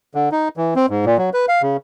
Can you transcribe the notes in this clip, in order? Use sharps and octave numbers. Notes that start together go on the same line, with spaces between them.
D3
D#4
E3
C4
G#2
A#2
F#3
B4
F5
C#3